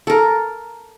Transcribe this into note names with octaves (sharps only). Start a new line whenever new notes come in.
A4 A#4